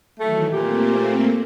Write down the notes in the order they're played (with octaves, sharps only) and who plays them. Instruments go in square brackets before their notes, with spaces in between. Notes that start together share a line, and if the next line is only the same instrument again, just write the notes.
[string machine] D#3 E3 F#3 [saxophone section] A3
[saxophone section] A#2 G4 [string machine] A3 A#3 C4